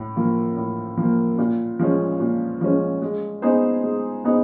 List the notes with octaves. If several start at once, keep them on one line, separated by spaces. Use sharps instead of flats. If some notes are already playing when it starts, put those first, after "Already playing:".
Already playing: A2
F3 A#3
A2
F3 A#3
A#2
F3 G#3 C#4
A#2
F3 G#3 C#4
G#3
B3 D#4 G#4 C5
G#3
B3 D#4 G#4 C5